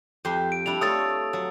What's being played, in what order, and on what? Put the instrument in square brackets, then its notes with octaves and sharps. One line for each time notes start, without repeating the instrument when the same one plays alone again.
[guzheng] F2 G4 C6
[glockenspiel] D7
[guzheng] G3 D4 E4 [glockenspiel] F7
[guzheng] A3 F4 C#5 [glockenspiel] D#6 E6 A6
[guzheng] F#3